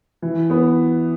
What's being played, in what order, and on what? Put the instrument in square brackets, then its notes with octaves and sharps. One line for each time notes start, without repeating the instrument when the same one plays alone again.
[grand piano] E3
B3